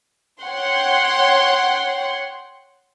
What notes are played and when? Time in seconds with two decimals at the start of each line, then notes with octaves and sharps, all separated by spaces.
0.43 C#5 F#5 G5 C6